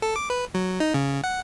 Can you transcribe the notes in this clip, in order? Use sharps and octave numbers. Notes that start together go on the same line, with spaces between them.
A4
D6
B4
F#3
D#4
C#3
F#5